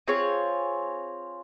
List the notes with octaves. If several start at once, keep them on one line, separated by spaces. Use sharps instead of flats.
C4 F4 G#4 C#5